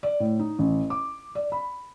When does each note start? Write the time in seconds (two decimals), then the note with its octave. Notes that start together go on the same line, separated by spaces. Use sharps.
0.03 D5
0.20 A2
0.39 D#4
0.59 A1
0.90 D6
1.35 D5
1.52 B5